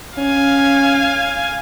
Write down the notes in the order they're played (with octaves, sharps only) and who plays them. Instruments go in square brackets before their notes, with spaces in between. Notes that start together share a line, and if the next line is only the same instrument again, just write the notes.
[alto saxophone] C#4 [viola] F5 G#5